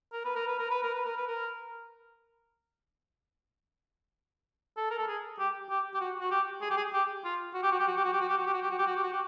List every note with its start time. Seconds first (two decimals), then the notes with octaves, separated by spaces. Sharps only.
0.13 A#4
0.25 B4
0.36 A#4
0.48 B4
0.59 A#4
0.71 B4
0.83 A#4
0.94 B4
1.05 A#4
1.17 B4
1.28 A#4
4.77 A4
4.91 A#4
4.99 A4
5.08 G#4
5.39 G4
5.70 G4
5.94 G4
6.00 F#4
6.20 F#4
6.31 G4
6.62 G#4
6.70 G4
6.77 G#4
6.93 G4
7.25 F4
7.54 F#4
7.63 G4
7.72 F#4
7.79 G4
7.88 F#4
7.97 G4
8.04 F#4
8.13 G4
8.21 F#4
8.29 G4
8.38 F#4
8.46 G4
8.54 F#4
8.62 G4
8.70 F#4
8.79 G4
8.87 F#4
8.96 G4
9.04 F#4
9.13 G4